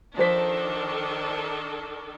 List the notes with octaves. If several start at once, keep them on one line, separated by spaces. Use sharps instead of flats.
D#3 F3 D4 A4 C5 B6